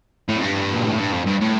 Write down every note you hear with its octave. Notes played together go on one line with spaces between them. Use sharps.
A2
F2
G2
A#2
A2
G2
F2
G2
A2